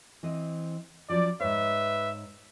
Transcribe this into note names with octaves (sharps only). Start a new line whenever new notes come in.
E3 C4 D#5
F3 F#3 C#4 D5
G#2 B4 C#5 E5